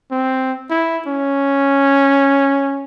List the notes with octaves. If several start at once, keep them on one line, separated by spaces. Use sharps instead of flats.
C4
E4
C#4